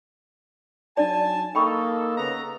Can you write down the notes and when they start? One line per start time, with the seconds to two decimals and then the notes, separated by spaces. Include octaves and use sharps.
0.97 F#3 D4 D#4 D5 G#5 A5
1.55 A#3 D#4 A4 G5 B5 C#6
2.17 C#3 B3 A#5